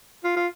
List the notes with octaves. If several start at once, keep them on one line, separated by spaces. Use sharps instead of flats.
F4
F4